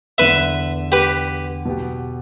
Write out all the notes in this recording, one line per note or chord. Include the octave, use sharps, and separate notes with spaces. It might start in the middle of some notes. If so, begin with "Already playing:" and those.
E2 D3 B3 B4 E5
G4 B4
B2 B3 G4